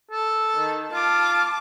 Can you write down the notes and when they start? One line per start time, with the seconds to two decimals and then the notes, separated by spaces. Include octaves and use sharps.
0.11 A4
0.56 D#3
0.93 F4 A5 D6